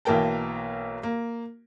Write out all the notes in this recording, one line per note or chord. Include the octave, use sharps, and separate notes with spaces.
B1 E3 A#3 A#4 G5 A5
A#3